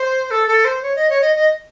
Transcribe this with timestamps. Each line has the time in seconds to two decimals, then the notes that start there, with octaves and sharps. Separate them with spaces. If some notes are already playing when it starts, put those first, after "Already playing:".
Already playing: C5
0.31 A4
0.48 A4
0.65 C5
0.83 C#5
0.96 D#5
1.10 C#5
1.22 D#5
1.36 D#5